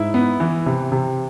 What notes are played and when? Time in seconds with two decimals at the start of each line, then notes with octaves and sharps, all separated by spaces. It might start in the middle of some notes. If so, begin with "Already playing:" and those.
Already playing: G#2 E4 E5
0.14 B3
0.40 E3
0.66 C3
0.92 C3